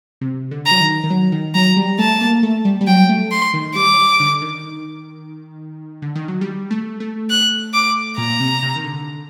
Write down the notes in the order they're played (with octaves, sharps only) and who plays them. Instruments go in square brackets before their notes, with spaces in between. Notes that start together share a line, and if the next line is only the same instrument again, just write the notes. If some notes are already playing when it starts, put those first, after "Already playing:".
[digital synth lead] C3
D3
[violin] A#5
[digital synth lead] F#3
D#3
D#3
F#3
D#3
[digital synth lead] F#3 [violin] A#5
[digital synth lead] G3
[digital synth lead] A3 [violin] A5
[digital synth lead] A#3
A3
G3
G3
[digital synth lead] F#3 [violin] G5
[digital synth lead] A3
[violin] C6
[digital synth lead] D#3
[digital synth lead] G3 [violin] D6
[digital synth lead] D3
D#3
D3
D#3
F#3
G3
A3
A3
[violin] F#6
D6
[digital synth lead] A#2 [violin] A#5
[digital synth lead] C3
C3
D#3
D3